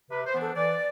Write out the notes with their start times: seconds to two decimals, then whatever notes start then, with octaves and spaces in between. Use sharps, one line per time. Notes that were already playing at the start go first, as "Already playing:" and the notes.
0.11 C3 B4
0.27 C5
0.34 E3 B3 D4
0.41 A4
0.56 E3 D5